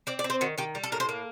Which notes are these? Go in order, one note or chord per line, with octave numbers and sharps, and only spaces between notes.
C4 D5
D5
C4
C5
D#3 F#4
D#3 G4
G3
A4
A2 A#4
C5
A#3